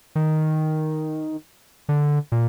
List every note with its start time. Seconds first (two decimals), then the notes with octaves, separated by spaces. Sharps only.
0.15 D#3
1.89 D3
2.32 A#2